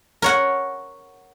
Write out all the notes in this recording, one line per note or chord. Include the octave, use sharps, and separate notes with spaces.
A#4 C#5 F#5